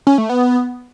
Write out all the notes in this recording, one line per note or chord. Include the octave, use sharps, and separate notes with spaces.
C#4
A3
B3